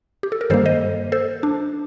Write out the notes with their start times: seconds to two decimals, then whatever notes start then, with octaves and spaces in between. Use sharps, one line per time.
0.23 G4
0.32 A4
0.41 A#4
0.50 G2 D#3 G3 A#3 A4 C5
0.66 C5 D#5
1.12 A4 C5
1.43 D4